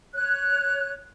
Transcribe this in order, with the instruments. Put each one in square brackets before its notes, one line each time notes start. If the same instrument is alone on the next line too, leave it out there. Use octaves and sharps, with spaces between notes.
[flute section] C#5 F#6